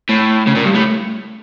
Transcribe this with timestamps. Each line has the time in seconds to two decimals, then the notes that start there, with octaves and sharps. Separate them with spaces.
0.09 A2
0.47 C#3
0.55 A#2
0.65 G2
0.74 A2